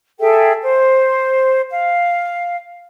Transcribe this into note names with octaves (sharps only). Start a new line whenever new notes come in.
G#4 A4 E5 G5
C5
F5